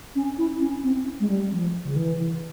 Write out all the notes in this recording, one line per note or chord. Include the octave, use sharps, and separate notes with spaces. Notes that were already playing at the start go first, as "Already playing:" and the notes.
C#4
E4
C#4
C4
G#3
G3
F3
C#3
E3